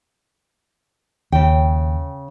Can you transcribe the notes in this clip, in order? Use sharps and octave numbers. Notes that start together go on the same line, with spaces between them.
D#2 C#3 G5